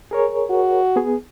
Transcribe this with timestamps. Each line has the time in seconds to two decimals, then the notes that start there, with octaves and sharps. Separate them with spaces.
0.11 G#4 A#4 C#5
0.50 F#4
0.96 B3 G#4